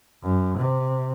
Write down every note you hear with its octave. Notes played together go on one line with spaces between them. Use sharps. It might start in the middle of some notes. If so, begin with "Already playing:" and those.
F#2
C3